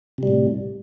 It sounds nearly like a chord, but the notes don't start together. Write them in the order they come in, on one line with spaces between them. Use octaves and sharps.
C3 G3 A2